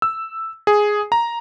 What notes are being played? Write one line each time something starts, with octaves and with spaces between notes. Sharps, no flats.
E6
G#4
A#5